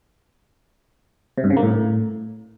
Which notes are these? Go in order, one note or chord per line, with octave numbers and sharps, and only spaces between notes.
C3
G2
C#3
A#3
A2